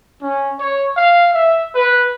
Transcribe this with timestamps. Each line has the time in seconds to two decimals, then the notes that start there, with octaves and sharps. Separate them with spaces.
0.22 C#4
0.59 C#5
0.96 F5
1.33 E5
1.74 B4